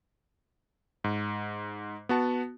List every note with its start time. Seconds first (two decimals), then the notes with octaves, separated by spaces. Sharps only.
1.04 G#2
2.09 B3 F#4 A5